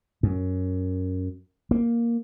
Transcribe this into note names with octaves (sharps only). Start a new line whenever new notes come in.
F#2
A#3